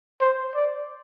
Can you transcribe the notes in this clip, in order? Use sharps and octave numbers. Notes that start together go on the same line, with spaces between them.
C5
D5